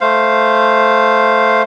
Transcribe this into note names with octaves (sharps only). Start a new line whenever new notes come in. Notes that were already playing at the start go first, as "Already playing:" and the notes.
A3 C5 F5